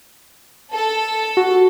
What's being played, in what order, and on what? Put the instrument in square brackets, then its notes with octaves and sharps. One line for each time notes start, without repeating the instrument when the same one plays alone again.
[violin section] A4
[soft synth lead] F#4